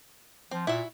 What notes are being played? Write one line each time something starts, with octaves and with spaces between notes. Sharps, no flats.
F3 C4
A#2 E4 F#4 E5